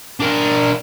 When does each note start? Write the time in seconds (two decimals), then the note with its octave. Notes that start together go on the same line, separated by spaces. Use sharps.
0.20 D4 A#4